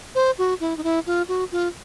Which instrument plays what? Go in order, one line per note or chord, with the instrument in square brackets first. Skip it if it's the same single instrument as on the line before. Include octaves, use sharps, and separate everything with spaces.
[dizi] C5
F#4
E4
D#4
E4
F4
F#4
F4